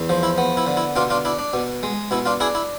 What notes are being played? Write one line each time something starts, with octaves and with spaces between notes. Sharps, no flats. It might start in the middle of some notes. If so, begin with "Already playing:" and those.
Already playing: E2
F3
E4
B3
E4
D3
E4
B2 D4 F4
D4 F4
D4 E4
D4
B2
G#3
B2 E4
D4 F4
D4 E4 G#4
E4